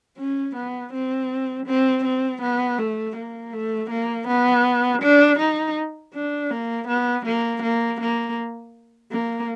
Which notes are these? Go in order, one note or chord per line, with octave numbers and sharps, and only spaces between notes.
C#4
B3
C4
C4
C4
B3
A3
A#3
A3
A#3
B3
D4
D#4
D4
A#3
B3
A#3
A#3
A#3
A#3